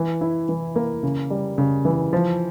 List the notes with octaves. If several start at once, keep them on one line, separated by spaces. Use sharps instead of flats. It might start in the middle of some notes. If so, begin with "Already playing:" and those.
Already playing: E3
E4
E3
A#3
C#3
G3
C#3
E3
F3